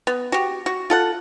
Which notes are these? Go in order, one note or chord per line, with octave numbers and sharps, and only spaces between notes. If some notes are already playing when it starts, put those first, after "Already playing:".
B3
F#4 G4
F#4
F4 A4 F#5